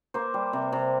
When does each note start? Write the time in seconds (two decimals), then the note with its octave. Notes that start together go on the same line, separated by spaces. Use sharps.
0.14 A#3 C5
0.34 G3
0.53 C3
0.73 C3